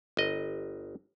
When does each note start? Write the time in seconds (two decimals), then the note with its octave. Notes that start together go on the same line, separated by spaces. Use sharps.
0.17 G1 D#5